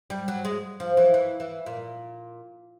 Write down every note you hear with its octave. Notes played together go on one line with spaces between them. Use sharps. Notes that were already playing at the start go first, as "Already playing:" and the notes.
G3
F#3
G#3
F3
E3
E3
E3
A#2